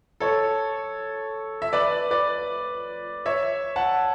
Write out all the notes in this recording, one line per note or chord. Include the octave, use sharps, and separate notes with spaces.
A4 C#5
E5
B4 D5
B4 D5
C#5 E5
F#5 A5